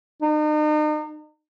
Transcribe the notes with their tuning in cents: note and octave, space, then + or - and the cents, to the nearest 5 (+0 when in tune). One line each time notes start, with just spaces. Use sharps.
D#4 -40